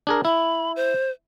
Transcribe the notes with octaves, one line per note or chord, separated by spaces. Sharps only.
D4 G#4 A#4
E4 B5
C5